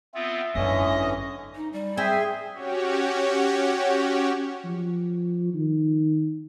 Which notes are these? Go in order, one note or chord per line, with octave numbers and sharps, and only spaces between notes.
B3 C4 F4 E5
G#1 F#2 D3 E3 C#4 D#5 D#6
D#4
G3
C4 G#4 E5 G#5
C#4 F#4 G4 C#5
F3
D#3